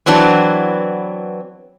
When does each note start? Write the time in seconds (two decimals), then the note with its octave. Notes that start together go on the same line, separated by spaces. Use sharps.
0.06 E3 F#3 B3 C4 D4